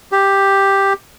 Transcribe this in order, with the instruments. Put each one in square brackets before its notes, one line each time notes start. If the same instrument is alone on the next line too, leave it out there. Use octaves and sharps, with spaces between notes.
[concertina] G4